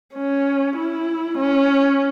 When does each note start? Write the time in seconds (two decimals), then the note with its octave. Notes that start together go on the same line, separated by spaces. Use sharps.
0.14 C#4
0.76 E4
1.38 C#4